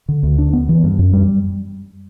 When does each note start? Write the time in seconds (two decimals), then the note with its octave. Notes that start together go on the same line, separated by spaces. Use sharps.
0.09 D3
0.23 D2
0.38 D4
0.53 B3
0.69 E3
0.84 G2
0.99 F#2
1.13 G3